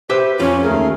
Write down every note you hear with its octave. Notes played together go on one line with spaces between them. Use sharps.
G4 B4 C5 E5
F2 C#4 F4 C#5
D#2 A3 G#4 A#4